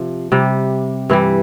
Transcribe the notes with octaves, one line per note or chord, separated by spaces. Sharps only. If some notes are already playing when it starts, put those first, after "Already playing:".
Already playing: C3 F3
C3 G3
G2 E3 G3